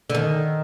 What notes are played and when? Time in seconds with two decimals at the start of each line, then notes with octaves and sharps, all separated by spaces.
0.10 D3
0.15 D#3